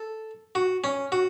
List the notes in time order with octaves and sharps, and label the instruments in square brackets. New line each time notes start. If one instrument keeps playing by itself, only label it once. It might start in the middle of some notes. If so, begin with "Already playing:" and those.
Already playing: [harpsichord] A4
F#4
C#4
F#4